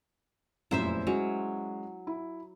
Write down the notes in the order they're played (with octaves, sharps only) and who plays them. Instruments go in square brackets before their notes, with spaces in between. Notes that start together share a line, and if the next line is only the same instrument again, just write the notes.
[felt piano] F1 F#2 A#2 [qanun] E4 C5 E5
[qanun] F#3 [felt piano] G#3 C#4
[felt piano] E4